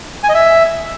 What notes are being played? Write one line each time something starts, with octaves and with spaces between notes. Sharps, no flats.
G#5
D#5
E5